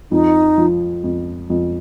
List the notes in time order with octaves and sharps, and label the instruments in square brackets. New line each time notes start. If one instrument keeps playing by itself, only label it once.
[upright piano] F2 [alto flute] D#4
[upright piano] F3
F2
F2